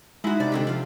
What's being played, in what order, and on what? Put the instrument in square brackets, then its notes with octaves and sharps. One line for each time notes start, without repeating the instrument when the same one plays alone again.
[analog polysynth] G#3 [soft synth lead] D#4 [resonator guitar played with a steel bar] E4 F#4
[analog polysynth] C3 [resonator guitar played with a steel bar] D4 D5
[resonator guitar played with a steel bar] D3 C4 G4
[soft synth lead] F3 [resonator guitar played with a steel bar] D4 F4